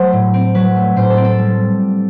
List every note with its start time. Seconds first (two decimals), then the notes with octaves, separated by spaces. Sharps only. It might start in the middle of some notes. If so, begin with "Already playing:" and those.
Already playing: F#3 A3 C5
0.13 A2
0.34 C4
0.55 F#3 B4
0.76 A3
0.96 A2 C5
1.11 A4
1.17 C4
1.24 A4
1.39 G3